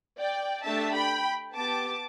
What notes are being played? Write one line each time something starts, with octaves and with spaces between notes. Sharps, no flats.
D5 G5
A3 D4 G4 E5 A5
G5 B5
B3 G4 A5 D6